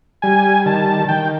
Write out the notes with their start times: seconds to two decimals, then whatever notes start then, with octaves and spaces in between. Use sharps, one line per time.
0.22 G3 G#5
0.66 D#3 A5
1.08 D#3 G5